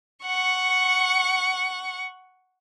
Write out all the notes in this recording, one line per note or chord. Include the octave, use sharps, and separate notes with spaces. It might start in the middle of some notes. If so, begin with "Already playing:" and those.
F#5 C#6